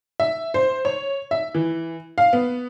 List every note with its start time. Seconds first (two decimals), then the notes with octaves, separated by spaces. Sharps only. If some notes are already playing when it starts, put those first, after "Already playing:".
0.20 E5
0.54 C5
0.85 C#5
1.31 E5
1.54 E3
2.18 F5
2.33 B3